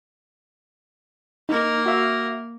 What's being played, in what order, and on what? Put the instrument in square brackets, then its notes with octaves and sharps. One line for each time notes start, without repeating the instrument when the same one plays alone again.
[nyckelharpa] A#3 A#4 [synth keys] D#4
[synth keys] F#4 E5 F5